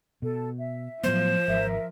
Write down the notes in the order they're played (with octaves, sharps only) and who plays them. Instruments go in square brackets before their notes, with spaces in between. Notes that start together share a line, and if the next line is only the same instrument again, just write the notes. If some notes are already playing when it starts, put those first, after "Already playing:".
[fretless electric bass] B2 [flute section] A4
[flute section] E5
[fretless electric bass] A2 F#3 B3 [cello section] F3 [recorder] C5
[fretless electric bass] G#1 [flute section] A#4 E5